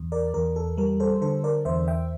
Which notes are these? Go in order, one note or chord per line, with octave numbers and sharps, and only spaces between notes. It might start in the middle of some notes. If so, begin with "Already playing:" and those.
Already playing: E2
A#4 D5
E2 A#4
A4
G3 A#4
A4 C5
D3 A4 C5
A#4 D5
E2 C5 E5
E5 G5